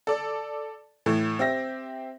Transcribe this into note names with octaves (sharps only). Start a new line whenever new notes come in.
A4 D5
A2 E3 A3
C4 G4 E5 A#6